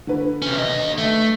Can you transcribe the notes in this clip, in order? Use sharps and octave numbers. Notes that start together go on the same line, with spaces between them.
D3 B4
C3 C#4
D#2 D#5
A3